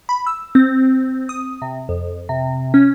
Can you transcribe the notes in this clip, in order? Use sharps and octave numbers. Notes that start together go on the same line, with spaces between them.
B5
E6
C4
D#6
C3
F2
C3
C#4